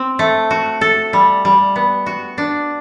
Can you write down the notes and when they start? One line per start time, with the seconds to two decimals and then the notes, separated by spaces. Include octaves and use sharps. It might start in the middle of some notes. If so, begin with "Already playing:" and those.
Already playing: C4
0.19 A3
0.51 F#4
0.81 A4
1.13 G3
1.45 G3
1.76 B3
2.06 F#4
2.38 D4